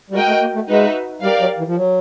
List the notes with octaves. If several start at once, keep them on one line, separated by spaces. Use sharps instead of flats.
G3
G#3 F#4 A#4 D#5 G5
A3
A#3
A3
G#3 D#4 F#4 B4 E5
G3 G4 A#4 D5 F5
F#3
E3
F3
F#3